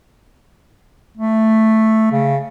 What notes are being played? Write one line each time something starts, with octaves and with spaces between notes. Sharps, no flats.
A3
C#3